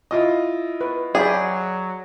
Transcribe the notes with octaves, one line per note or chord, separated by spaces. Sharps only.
E4 F4 D#5
B4
F#3 G#4 D5 G5 B5